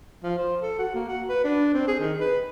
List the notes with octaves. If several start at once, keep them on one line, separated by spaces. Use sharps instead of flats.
F3
C5
A4
F#4
A#3
F#4
B4
D4
C4
G#4
D#3
B4